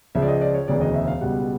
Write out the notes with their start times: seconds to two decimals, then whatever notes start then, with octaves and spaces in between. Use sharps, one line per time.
0.15 C#2 C#3 F3 G#3 E5
0.22 D5
0.28 D#5
0.41 D5
0.54 C#5
0.68 E1 D2 C#3 E3 D5
0.81 D#5
0.94 E5
1.07 F5
1.21 C#2 B2 G3 F#5